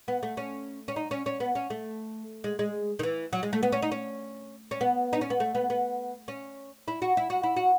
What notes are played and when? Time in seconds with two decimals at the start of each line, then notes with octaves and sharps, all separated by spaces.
0.08 B3
0.23 A3
0.37 C#4
0.88 C#4
0.96 D#4
1.11 C#4
1.26 C#4
1.40 B3
1.55 C#4
1.70 A3
2.44 G#3
2.59 G#3
2.99 D#3
3.03 E3
3.33 F#3
3.43 G#3
3.53 A3
3.63 B3
3.72 C#4
3.82 D#4
3.91 C#4
4.71 C#4
4.81 B3
5.13 D#4
5.21 C#4
5.30 B3
5.40 A3
5.55 B3
5.70 B3
6.28 C#4
6.88 E4
7.02 F#4
7.17 E4
7.30 F#4
7.43 E4
7.57 F#4